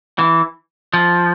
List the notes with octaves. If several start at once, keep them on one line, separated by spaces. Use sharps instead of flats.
E3
F3